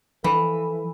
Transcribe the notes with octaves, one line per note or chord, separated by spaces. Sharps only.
E3 F3 A4